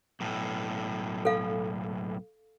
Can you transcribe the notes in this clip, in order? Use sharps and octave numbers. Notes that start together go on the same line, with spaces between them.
B1 A2
A4 F5